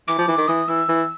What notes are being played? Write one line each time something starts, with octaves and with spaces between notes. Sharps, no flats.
E3 D6
F3
E3
D#3
E3 D#6
E3 E6
E3